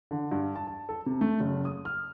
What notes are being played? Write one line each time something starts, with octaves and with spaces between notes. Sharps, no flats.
D3
G2
A5
A5
A4
C3
A3
F#1
D#6
F6